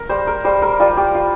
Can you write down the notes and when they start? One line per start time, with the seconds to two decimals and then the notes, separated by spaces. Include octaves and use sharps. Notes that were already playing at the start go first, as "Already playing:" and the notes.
Already playing: A#4
0.09 G3 C5
0.27 A#4
0.45 G3 C5
0.62 A#4
0.80 G3 F4
0.97 G4
1.15 F4